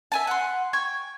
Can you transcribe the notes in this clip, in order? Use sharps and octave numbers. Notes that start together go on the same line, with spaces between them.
E5 G#5 A5
F#5 C6
G5 G#5 C#6